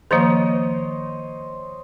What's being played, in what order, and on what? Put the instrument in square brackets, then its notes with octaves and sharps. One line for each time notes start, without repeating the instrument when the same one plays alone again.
[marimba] D#3 F3 A#3 [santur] C5 C#5 D#5